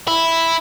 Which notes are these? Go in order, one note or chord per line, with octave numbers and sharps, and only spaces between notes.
E4